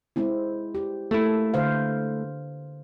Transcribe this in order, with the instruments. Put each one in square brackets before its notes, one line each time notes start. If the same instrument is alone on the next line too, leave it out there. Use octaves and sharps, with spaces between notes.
[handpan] G#3 C4 E4
G4
[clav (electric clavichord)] A3 E4 [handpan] A#3 A4
[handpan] D3 C5 F5